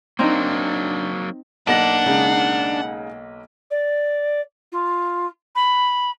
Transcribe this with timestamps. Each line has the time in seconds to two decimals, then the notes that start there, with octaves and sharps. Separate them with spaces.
0.19 F#3 A#3 C4 D4 D#4
1.67 B1 A#3 D4 F#5 A#6
2.06 C#3 G#3 D#4
3.71 D5
4.72 F4
5.55 B5